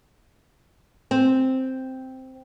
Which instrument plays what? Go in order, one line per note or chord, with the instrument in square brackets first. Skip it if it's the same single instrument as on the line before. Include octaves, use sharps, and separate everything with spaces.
[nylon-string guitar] C4